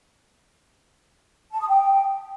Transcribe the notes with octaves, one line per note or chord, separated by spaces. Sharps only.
A5
D#6
G5